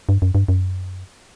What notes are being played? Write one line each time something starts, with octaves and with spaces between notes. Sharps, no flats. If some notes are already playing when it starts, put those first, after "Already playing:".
G2
F#2
G2
F#2